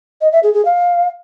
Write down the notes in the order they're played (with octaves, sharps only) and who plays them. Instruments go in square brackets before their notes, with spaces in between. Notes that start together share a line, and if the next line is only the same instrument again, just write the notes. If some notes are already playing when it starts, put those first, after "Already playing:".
[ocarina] D#5
E5
G#4
G#4
F5